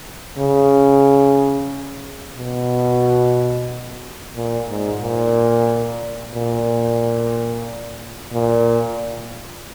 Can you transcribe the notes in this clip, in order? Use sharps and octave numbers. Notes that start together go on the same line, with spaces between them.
C#3
B2
A#2
G#2
A#2
A#2
A#2